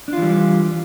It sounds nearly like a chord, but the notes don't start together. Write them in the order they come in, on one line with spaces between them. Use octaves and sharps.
D4 F4 E3 G3